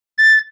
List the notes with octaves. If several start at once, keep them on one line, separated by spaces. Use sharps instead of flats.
A6